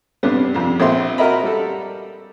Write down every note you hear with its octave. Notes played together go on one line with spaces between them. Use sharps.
G2 C3 B3
F2 C3
A#1 C4 E5 C6
F#4 A#4 D#5 E5 A#5 B5
G3 A4